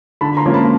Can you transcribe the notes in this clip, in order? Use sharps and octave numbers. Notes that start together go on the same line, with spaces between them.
D3 A5 B5
A#5 C6
F3 A#3 C#4
A5 B5